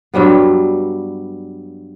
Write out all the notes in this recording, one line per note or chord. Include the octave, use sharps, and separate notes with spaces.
G2 F#3 G3 B3